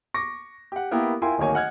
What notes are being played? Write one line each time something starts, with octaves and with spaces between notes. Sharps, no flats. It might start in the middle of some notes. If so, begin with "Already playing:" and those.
C#6 D6 A#6
G4 F#5
A#3 B3 E4 G4 A#4 G5
E4 F4 A#4 G5 G#5 C6
D1 D#3 A#3 C#5 G#5
D#5 F#5 F6 G#6